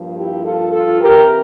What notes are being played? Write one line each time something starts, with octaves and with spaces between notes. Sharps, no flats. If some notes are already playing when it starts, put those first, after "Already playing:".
Already playing: G2 F3 A#3
E4 G4
F4 A4
F4 A4
C3 E3 A#3 G4 A#4